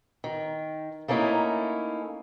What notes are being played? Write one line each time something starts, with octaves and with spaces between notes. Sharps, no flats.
D#3
A3 A#3 C#4 D#4 E4